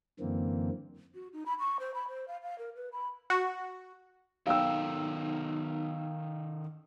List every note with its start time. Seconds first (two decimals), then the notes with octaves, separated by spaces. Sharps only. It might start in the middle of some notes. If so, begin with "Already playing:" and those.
0.20 F#2 D3 E3 A#3 C4
1.15 F#4
1.33 D#4
1.46 B5
1.59 C#6
1.80 C5
1.94 B5
2.08 C5
2.28 F5
2.43 F5
2.58 A#4
2.76 B4
2.93 B5
3.30 F#4
4.47 B1 D#3 A4 A#4 F5 G5 E6